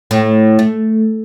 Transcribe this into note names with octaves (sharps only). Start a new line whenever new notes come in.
A2
A3